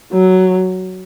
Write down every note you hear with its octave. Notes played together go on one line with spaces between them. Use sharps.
F#3